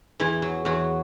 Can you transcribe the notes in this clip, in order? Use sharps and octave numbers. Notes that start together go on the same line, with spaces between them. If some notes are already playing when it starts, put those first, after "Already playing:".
E2 E3 E4
F#3
E2 F#3 F#4